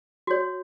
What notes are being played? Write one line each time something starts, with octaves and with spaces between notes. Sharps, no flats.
F#4 C#5